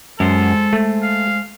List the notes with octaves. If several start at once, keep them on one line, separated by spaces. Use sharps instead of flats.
F#2 G#3 A4 C5
A3
F5